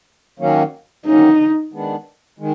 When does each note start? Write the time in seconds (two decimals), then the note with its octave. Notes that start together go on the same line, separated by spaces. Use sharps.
0.39 D#3 F#3 A#3 C#4
1.06 D#3 F#3 A#3 C#4 D#4
1.73 D#3 G#3 B3 D4
2.39 D#3 G#3